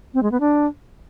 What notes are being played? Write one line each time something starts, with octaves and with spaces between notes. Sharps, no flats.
C4
G#3
B3
D4